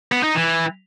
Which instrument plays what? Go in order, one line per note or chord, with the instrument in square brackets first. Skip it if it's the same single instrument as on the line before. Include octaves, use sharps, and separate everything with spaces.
[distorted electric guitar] B3
D#4
E3